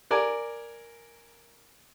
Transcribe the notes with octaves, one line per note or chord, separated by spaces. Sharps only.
A#4 D5 G#5